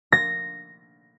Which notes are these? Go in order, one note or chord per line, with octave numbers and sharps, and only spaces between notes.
A#6